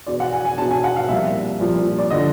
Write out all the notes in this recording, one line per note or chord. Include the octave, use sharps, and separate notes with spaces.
E2 B2 D5
F#5
G#5
G#5
E2 B2 A5
G#5
F#5
F5
C2 A#2 F3 E5
C2 A#2 F3
D5
D3 F3 D#5